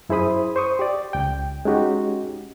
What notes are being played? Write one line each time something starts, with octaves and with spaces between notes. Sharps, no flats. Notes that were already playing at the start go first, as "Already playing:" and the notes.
F#2 E4 G#4 C5 B5 D#6
C5 C#6 D#6
G4 D5
C#2 G5
G#3 C#4 D#4 F#4 G4